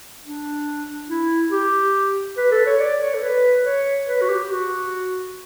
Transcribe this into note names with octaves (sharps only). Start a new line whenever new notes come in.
D4
E4
G4
B4
A4
C#5
D5
C#5
A4
B4
C#5
B4
F#4
G4
F#4